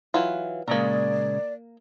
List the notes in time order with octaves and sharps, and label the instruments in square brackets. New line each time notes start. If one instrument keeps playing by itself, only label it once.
[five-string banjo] E3 F#3 F4
[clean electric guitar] A#2 C#3 G#3 [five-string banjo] A#3 A#4 [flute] D5